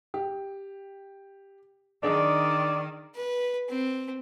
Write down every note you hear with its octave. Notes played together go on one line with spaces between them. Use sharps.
G4
D#3 D4 G#4 D5 D#5
B4
C4